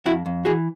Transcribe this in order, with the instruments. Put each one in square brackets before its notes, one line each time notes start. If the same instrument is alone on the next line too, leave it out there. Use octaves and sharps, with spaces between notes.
[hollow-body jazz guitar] F2 E4 F#4
F2
E3 F#4 G#4